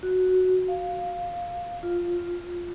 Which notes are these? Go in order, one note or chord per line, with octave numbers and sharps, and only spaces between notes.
F#4
F5
F4